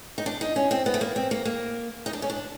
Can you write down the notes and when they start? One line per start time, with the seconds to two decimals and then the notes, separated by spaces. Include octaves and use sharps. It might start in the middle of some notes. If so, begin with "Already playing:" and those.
0.18 D#4
0.26 D4
0.41 D#4
0.56 C#4
0.71 C4
0.86 B3
0.94 A3
1.01 A#3
1.16 C4
1.31 A#3
1.45 A#3
2.06 D#4
2.13 D4
2.22 C#4
2.30 D4